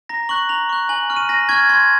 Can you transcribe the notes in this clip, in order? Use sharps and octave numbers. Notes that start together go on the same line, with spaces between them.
A#5 A#6
C#6 F#6 F#7
A#5 F7
C#6 F#6
G#5 F#7
C#6 F6
D#7
G#5 A#6
C#6 F6 G#6
C6 G#6